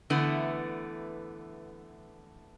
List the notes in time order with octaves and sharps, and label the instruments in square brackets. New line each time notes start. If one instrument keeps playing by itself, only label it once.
[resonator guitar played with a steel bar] D3 E3 A3 B3